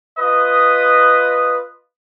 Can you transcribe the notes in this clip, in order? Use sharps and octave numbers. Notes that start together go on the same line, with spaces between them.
F4 B4 D#5 D#6